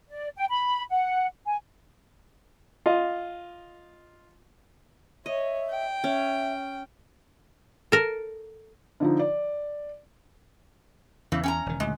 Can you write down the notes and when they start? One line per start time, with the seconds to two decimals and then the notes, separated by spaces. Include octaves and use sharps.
0.09 D5
0.36 G5
0.49 B5
0.90 F#5
1.45 G#5
2.86 F4 D#5
5.26 C#5 D#5 E5
5.71 G5
6.04 C#4 E5
7.92 A4 A#4
9.00 D3 F3 D#4
9.19 D5
11.32 E2 C#3 E3
11.43 C#4 G5 A#5
11.66 E1 D#3
11.80 D2 A#2 C#3 G#3